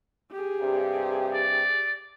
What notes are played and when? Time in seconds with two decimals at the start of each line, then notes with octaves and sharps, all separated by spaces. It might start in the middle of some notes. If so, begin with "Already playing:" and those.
0.31 G4 G#4
0.61 G2 C3
1.34 D5